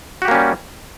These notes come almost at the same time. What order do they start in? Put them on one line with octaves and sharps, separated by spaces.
F#4 G4 A#3 C#4 G3